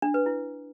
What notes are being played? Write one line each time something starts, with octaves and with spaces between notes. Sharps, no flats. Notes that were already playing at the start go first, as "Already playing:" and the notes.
D4
B4
E4